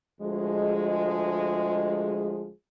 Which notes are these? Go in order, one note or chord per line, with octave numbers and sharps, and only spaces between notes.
D2 F3 G#3